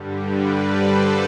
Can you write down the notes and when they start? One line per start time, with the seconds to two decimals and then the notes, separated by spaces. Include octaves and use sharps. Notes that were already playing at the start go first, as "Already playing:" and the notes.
Already playing: G2 D3 G3
0.25 B4 D5
0.70 A4 C5